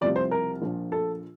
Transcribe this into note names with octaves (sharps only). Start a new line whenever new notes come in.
C2 C3 F3 D5
C5
A#4
A#1 A#2 F3
A4